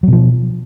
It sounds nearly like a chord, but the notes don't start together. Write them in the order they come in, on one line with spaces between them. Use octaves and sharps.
F#3 B2 F3